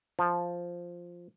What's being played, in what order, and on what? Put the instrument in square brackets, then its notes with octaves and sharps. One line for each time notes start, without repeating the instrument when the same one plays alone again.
[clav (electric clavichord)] F3